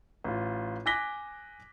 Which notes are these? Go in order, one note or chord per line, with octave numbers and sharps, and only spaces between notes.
A1 F4
G#5 D6 F#6 A#6 B6 G7